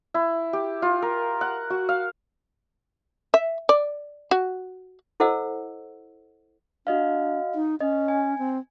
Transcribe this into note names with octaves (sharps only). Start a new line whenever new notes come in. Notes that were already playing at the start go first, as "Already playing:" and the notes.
E4
G4
F4
A#4
F#5
F#4
F5
E5
D5
F#4
E4 A4 C5 D#5 F#5 E6
D4 F#4 D#5 F5
D#4
C#4 D#5
G#5
C4